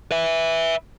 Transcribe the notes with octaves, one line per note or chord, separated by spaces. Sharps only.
B4 E5